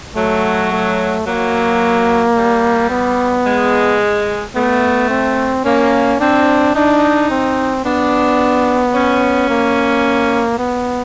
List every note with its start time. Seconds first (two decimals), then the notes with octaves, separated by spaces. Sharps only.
0.16 F#3 A3
0.72 A3
1.26 F#3 A#3
2.36 G3
2.90 B3
3.46 G#3
4.55 A3 B3
5.10 C4
5.65 A#3 C#4
6.20 C4 D4
6.75 D4 D#4
7.31 C4
7.85 B3 D4
8.94 C#4
9.50 A#3
10.59 B3